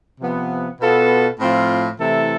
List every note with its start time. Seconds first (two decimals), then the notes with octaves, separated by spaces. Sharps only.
0.19 C3 F3 B3
0.79 B2 B3 F4 A4
1.39 A2 F3 C4 F4
1.99 C3 E3 A3 E4 A4